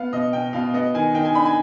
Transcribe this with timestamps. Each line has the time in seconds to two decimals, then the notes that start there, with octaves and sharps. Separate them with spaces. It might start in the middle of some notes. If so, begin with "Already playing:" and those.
Already playing: B3 F5
0.13 B2 D#5
0.33 B2 G5
0.53 B2 F5
0.74 B3 D#5
0.94 D#3 G#5
1.14 D#3 G5
1.25 G#5
1.34 D4 B5
1.45 G#5